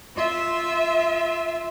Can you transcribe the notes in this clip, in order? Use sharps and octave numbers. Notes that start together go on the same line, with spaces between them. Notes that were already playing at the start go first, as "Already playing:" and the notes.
F4 E5